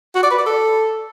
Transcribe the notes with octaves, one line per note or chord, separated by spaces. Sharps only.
F#4
D5
B4
D5
A4